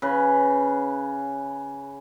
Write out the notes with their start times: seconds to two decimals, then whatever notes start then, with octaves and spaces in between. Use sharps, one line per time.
0.02 C#3 B4